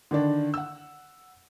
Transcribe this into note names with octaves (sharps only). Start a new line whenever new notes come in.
D3 D#3 D4
F#5 E6